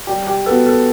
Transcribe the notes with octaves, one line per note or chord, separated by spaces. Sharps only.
G3 G4
G4
B3 F#4 A4 B4
A4